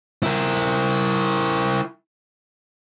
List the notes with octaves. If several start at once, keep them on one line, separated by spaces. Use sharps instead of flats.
E4 A#4